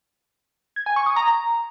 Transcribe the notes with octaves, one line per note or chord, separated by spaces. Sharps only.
G#6
G#5
C#6
D#6
A#5